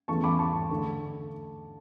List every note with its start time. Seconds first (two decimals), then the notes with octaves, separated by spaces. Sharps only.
0.08 E2 C#3 E3 A3 A5 C#6
0.24 B5 D6
0.39 A5 C#6
0.71 D3 A3